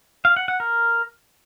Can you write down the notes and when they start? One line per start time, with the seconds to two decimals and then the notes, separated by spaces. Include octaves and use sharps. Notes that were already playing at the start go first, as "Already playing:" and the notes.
0.25 F5
0.37 F#5
0.48 F#5
0.60 A#4